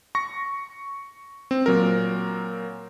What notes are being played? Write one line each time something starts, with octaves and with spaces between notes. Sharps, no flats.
C#6 A#6
C4
A#2 F#3 A#4